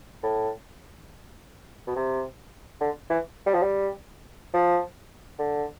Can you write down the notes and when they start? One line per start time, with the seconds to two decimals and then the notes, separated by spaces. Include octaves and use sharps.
0.23 A2
1.87 B2
1.96 C3
2.81 D3
3.10 E3
3.46 G3
3.54 F3
3.62 G3
4.54 F3
5.39 D3